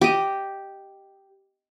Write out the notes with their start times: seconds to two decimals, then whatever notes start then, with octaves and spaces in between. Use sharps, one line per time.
0.01 G4 D#5